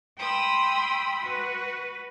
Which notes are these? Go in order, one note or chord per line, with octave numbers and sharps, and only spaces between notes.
G5 B5 C6 D#6 E6
F#4 B4